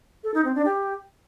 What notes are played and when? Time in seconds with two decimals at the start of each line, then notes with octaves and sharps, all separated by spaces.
0.24 A4
0.34 D#4
0.45 C4
0.55 D4
0.66 G4